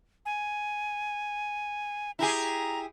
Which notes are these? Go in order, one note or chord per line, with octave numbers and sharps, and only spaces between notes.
G#5
E4 G4 G#4 A#5